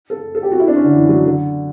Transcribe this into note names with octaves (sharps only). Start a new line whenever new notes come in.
A4
A4
G4
F#4
E4
D4
C#4
D3
E3
F#3
D3